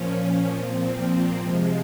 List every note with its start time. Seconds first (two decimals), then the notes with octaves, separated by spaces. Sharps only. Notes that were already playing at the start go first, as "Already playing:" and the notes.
Already playing: A#2 F3 C#4
0.11 C#4
0.54 A#2 F3 C4
0.97 A#3
1.39 C3 F3 G#3